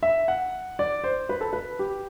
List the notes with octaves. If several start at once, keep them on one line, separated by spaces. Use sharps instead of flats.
E5
F#5
D5
C5
B4
A4
B4
G4